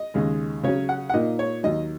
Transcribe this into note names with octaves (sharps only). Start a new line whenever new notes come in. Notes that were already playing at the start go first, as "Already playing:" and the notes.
Already playing: D#5
D#2 C#3 G#3
C#3 F#3 C#4 C#5
F#5
F#5
A#2 A#3 D#4 D#5
C#5
D#2 D#3 F#3 D#5